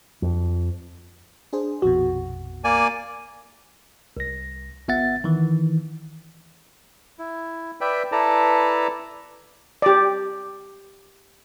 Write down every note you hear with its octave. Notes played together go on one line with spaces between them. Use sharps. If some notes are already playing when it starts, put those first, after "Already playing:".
F2
D4 G#4 C5
A#1 F2 B2 F#4
A#3 D5 G#5
C2 A#6
G1 B3 E5 F#5 A6
D#3 E3
E4
B4 D5 E5 G5
E4 A4 B4 D5 A5 A#5
G4 D5